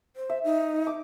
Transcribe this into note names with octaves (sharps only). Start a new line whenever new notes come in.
C5
E5
D#4
D6